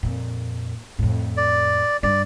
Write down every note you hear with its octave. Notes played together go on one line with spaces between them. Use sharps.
F2 A#2
F2 A2
D5
G2 D5